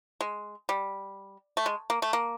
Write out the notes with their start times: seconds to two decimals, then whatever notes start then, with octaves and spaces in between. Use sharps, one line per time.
0.21 G#3
0.69 G3
1.57 A3
1.66 G#3
1.90 A#3
2.02 A3
2.13 A#3